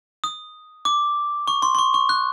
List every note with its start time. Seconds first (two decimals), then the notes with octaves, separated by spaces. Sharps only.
0.24 D#6
0.85 D6
1.48 C#6
1.62 C6
1.75 C6
1.79 C#6
1.94 C#6
2.09 F#6